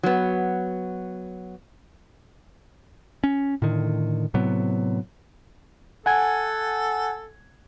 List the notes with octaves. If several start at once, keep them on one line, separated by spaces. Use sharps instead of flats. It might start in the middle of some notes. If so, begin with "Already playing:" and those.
F#3 B3
C#4
A2 D3 D#3
A2 C3 F#3 B3
A4 F#5 G#5 G#6